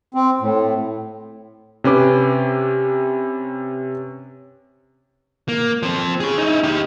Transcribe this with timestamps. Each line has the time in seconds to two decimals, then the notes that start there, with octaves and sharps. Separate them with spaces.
0.14 C4
0.41 A2
1.84 C3 C#4 B4 D6
5.48 A#3
5.83 F3 C4
6.20 G#4 C#5
6.38 D#4 E4
6.63 D#4 G4